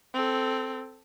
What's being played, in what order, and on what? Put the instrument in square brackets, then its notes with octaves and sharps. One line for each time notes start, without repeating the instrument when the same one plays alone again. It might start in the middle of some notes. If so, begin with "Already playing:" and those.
[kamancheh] C4 A4